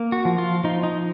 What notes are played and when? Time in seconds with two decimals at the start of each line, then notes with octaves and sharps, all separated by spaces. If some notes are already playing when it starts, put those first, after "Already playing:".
Already playing: A#3
0.12 F#4
0.25 F3
0.38 F4
0.64 F3 D#4
0.83 D#4